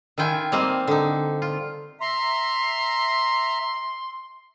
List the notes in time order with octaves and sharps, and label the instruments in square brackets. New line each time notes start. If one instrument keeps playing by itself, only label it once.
[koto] D#3 E4 F4 G5 G#5
G3 A#3 C4 D#5 F5
D3 D#4
F4
[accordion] E5 A#5 [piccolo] C6